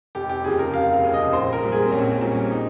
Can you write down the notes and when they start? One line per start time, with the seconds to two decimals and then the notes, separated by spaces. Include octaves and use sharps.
0.15 F1 G4
0.29 G4
0.44 D#2 C#3 F3 G#4
0.59 A#4
0.74 F1 F5
0.93 F5
1.03 D#2 C#3 F3
1.13 D#5
1.33 A#1 C5
1.53 A#4
1.63 A#2 G3
1.72 G#4
1.86 C4
1.92 A#1 C#4
2.12 C#4
2.21 A#2 G3
2.32 C#4
2.51 D#4